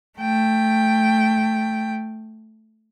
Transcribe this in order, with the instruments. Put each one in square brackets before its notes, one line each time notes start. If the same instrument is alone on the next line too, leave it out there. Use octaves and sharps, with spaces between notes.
[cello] A3 G5